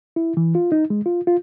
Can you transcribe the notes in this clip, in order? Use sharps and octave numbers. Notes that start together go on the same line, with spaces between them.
E4
E3
F4
D#4
G#3
F4
F4